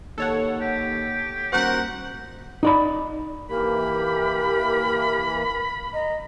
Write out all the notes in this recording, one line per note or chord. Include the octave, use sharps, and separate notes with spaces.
D#2 A4 C#5 F#5
G4
D#1 F#4 A#4 C5 F#5
D#4 D5 B5
E3 A#3 G4 A#4 B5
D#5 A#5